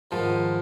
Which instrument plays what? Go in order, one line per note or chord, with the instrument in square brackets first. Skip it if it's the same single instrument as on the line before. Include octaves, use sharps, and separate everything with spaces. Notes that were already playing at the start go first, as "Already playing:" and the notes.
[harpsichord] G#2 D#3 G#3 B3 [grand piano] F3